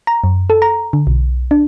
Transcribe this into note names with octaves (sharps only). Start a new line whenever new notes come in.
A#5
F#2
A4
A#5
D3
B1
D4